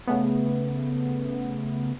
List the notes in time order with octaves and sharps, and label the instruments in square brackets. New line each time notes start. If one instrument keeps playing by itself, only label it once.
[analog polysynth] C#3 A3 B3